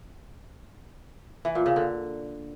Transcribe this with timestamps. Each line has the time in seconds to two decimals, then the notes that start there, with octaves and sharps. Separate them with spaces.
1.45 E3
1.55 A#2
1.66 C#3
1.76 D3